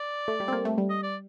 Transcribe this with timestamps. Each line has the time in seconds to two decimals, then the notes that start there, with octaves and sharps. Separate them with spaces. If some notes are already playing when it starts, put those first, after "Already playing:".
Already playing: D5
0.28 A3
0.40 G3
0.48 C4
0.53 A#3
0.65 A3
0.78 G3
0.90 D#5
1.03 D5